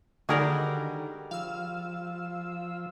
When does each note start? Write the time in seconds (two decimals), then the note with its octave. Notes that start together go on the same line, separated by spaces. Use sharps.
0.29 D3 D#3 G3 G#3 F#4 G#4 A#4 D5
1.31 F3 F5 E6